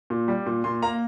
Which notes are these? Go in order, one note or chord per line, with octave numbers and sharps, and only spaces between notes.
A#2
G3
A#2
A#2 C6
A#3 A#5